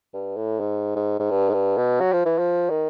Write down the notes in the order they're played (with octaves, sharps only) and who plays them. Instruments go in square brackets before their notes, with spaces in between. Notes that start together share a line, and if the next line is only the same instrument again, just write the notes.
[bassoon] G2
A2
G#2
G#2
G#2
G2
G#2
G2
B2
F#3
F3
E3
F3
D#3